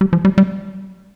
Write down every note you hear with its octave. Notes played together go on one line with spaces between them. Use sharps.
G3
F3
G3
G3